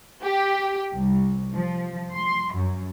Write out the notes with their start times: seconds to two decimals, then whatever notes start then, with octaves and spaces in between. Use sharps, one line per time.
0.23 G4
0.95 C2
1.55 F3
2.14 C6
2.54 F#2